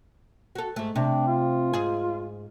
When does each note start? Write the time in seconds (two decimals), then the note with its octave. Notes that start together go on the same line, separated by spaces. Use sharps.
0.55 F#4 A4
0.76 G#2 A3
0.96 C3 D4
1.27 F4
1.73 G#2 G#4